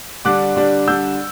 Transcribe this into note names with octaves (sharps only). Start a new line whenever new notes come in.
D3 G3 D4 D6 F#6
D3 G3 D4
D3 G3 D4 E6 G6